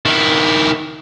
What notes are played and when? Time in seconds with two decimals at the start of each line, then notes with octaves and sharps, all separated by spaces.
0.06 D#3 E4